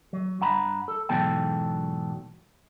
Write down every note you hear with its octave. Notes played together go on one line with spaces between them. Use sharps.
F#3
G2 F#5 A#5 B5
A4
E2 G#2 B2 F#3 A4 G5